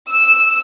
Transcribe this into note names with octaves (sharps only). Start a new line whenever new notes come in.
E6